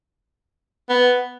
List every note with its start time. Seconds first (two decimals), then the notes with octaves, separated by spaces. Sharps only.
0.90 B3